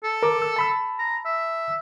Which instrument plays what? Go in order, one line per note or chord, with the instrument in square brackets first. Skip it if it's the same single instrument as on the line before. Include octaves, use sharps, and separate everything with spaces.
[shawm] A4
[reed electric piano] A#4 D6
E6
A5 B5 E6
[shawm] A#5
E5